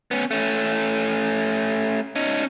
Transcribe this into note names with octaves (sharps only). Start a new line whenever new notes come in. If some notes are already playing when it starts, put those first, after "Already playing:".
B3 C#4
A3 C#4
C#4 D#4